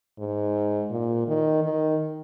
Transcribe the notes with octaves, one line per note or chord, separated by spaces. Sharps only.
G#2
A#2
D#3
D#3